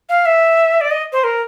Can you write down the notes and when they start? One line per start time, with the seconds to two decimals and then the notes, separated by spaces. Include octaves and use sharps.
0.09 F5
0.26 E5
0.81 D5
0.91 D#5
1.13 C5
1.24 A#4